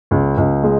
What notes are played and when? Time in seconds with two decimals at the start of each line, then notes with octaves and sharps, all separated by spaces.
0.11 C#2
0.37 C#2
0.63 G#3